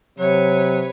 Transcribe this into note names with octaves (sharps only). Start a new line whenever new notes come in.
C3 F#3 B4 C#5